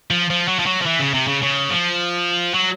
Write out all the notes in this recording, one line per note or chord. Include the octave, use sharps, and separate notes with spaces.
F3
F3
F#3
F3
F#3
F3
E3
C#3
C3
C#3
C#3
F3
F#3